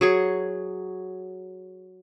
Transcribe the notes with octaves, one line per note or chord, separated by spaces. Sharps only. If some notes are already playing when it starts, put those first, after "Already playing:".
F#3 G#4 C#6